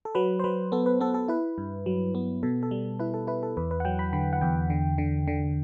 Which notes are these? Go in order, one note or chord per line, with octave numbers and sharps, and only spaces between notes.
A4
F#3 B4
C5
F#3 B4
B3 A4
B4
B3 A4
A4
E4 B4
G2
F#3
B3
B2 A4
A4
G3
E4 B4
A4
E4 B4
A4
E2 B4
B4
F#5
F#3 G5
B5
D3 B5
F#5
E2 G5
D3
D3
D3